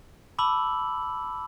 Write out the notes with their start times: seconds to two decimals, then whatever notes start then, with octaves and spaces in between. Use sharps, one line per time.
0.39 A5 B5 D6 E6 F#7